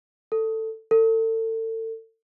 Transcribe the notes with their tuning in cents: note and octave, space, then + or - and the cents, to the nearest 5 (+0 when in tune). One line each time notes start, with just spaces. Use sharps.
A4 +15
A4 +35